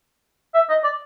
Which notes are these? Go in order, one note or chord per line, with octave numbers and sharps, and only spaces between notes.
E5
D#5
D5